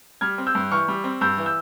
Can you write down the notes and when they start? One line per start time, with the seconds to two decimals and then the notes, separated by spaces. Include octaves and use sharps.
0.21 G3 F6 G#6
0.38 C4
0.47 E6 G6
0.55 G2
0.71 E3 C#6 F6
0.88 G3
1.04 C4
1.21 G2 E6 G6
1.38 E3
1.46 E6 G6